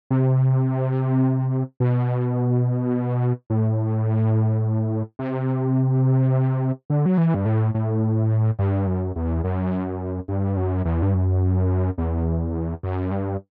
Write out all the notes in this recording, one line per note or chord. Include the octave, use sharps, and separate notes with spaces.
C3
B2
A2
C3
D3
F#3
E3
G2
A2
A2
G2
F#2
E2
F#2
G2
F#2
E2
G2
F#2
E2
F#2
G2